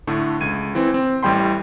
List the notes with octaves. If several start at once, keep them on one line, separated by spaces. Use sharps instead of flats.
A2 D3 A3
C#2 G#6 D#7
E3 C4
C4
A1 A2 G3 G5 B5 C6